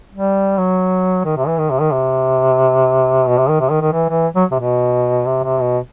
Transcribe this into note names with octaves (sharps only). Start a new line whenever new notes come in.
G3
F#3
D#3
C3
E3
D#3
C3
D#3
C3
B2
C3
D#3
C3
D#3
D#3
E3
E3
F#3
C3
B2
C3
C3
B2